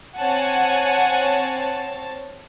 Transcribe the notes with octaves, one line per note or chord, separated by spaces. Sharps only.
C4 C#5 F#5 G#5 A5